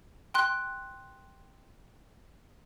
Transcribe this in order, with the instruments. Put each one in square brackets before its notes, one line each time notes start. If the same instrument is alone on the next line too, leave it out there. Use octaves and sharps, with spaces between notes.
[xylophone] G5 C6 F#6